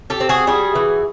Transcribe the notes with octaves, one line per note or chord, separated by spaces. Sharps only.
G4 A4
C4
F#4 G#4
G3 F#4 G#4
E3